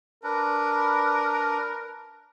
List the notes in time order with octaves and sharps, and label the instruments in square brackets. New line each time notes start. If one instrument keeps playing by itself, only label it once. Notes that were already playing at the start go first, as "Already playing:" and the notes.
[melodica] D4 B4 [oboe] A#4